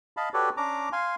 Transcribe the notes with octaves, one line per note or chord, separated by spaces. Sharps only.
D#5 F5 A5 B5
F#4 G4 A4 B4 C#5 D5
C#4 D4 A#5 D6
F5 G#5 C6